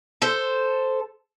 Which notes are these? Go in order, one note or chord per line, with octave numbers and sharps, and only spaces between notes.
A4 C5